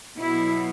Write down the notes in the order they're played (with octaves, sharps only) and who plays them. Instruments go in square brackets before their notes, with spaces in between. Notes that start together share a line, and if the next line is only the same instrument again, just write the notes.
[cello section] B2 F#3 E4